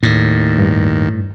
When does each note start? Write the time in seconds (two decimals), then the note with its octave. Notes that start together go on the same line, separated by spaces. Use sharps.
0.03 D#2 A2
0.58 G2